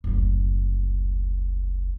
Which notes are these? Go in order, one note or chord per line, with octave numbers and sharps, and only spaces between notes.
F#1 D2